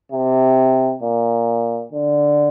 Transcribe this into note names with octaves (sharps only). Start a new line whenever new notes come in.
C3
A#2
D3